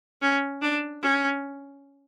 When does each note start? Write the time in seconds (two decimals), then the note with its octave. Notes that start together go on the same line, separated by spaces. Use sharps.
0.22 C#4
0.62 D4
1.02 C#4